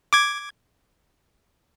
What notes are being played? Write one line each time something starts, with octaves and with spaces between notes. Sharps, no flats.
D6 G#6